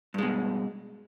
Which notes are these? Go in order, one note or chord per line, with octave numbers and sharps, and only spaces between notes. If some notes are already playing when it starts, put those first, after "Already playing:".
G2 B2 G#3